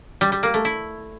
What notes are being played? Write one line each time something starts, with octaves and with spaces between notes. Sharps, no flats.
G3
G3
A#3
A3
E4